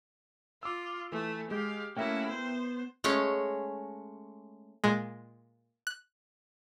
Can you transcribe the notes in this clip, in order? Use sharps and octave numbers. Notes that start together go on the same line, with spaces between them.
F4 D6 E6
E3 A3
G#3 G4 F5 G6
A3 A#3 C#4 E4 F#4 A#4 E5 G5
B3 C5
G#3 A3 C#4 C#5
A#2 G#3
F#6